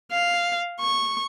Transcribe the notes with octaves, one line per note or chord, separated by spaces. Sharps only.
F5
C#6